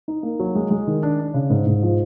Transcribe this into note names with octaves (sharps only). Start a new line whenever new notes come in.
D#4
A#3
F#3
G#3
G#3
D#3
D4
D4
C#3
G#2
G#2
F3